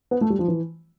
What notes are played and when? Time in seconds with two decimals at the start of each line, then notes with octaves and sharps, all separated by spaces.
0.11 B3
0.21 A3
0.30 G3
0.39 F3
0.48 E3